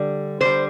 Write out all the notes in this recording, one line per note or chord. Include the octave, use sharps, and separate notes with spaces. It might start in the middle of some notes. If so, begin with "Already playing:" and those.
Already playing: D3 G3
D3 G3 C5